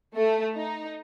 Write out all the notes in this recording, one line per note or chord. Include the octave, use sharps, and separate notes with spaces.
A3
D#4